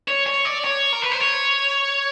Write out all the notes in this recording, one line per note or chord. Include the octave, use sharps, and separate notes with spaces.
C#5
C#5
D5
C#5
A#4
B4
C5
C#5